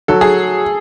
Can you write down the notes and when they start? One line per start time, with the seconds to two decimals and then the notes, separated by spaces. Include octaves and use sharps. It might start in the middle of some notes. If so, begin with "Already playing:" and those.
0.08 F#3 A4
0.21 G#4